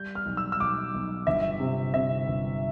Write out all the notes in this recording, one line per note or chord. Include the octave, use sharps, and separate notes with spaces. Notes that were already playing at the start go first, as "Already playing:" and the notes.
Already playing: G3 G6
F6
B1
E6
E6
B1 D6
B1
G1 E5
C3
C3 E5
G1